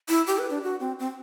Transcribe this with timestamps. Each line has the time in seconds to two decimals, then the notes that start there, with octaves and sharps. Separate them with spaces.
0.09 E4
0.27 G4
0.38 B4
0.50 D4
0.63 F#4
0.80 C4
0.99 C4